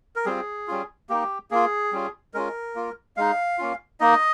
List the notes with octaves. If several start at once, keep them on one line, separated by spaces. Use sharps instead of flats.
A#4
G3 C4 F4 G#4
G3 C#4 F4
A#3 D#4 G4
A#3 F4 G#4
G3 C#4 F4
G#3 C#4 F4 A#4
A#3 F4
G#3 D#4 F5
A#3 C#4 F4
A#3 D#4 D#5